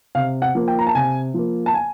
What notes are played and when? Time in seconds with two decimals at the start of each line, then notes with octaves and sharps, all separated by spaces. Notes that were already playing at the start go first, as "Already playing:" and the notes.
0.15 C3 F5
0.42 F#5
0.55 F3 A#3
0.68 G5
0.79 A#5
0.87 A5
0.95 C3 G#5
1.34 F3 A#3
1.66 A5
1.74 G#5